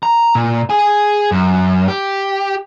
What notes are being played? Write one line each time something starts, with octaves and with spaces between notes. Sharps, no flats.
A#5
A#2
G#4 G#5
F#2
G4